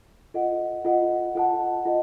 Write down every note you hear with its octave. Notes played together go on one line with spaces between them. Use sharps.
F4 A4 D#5 F#5
F4 A4 D#5 F#5
F4 A4 D#5 F#5 A5
F4 A4 D#5